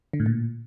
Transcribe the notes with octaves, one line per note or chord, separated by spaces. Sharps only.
D3
A2
A#2